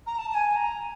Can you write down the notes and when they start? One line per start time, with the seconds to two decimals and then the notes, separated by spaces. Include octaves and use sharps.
0.06 A#5
0.18 A5
0.29 A5
0.34 G#5
0.56 A#5